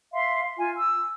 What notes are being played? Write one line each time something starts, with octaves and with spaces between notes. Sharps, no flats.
E5 F5 C6
F4 G#5
E6